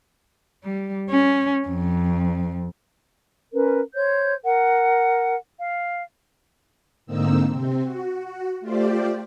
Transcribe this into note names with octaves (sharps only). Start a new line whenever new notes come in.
G3
C#4
F2
C#4 A#4 B4
C5 C#5 G6
A#4 F#5
F5
G#2 D3 A#3 C4 D#4 E6
C3 C4
F#4
F#4
A3 F4 G4 C5 D5